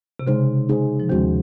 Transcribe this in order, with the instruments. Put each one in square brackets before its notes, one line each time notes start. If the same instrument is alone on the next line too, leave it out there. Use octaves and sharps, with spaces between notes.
[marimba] C3
[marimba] C#3 [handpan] G#3 D#4 G#4 C5
[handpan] G#3 D#4 G#4 C5
[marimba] F3
[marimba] D#2 D#3 [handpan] G#3 C#4 F#4 C5